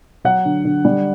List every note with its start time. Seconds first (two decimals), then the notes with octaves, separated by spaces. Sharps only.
0.25 F#3 F#5
0.45 D3
0.65 D3
0.85 G3